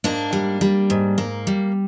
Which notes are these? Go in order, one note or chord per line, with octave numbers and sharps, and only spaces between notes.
G#2 A#3 D4
G3
G3
G#2
A#3
G3